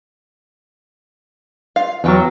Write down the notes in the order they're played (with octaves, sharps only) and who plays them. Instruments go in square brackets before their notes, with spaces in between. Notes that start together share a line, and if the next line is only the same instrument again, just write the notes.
[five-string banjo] F4 F5
[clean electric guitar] E2 F#3 [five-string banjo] E3 B4 G5